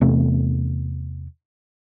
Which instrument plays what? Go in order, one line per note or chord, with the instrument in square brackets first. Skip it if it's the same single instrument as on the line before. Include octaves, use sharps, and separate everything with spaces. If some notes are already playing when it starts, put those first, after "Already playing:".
[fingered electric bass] E2 C3 A3 B3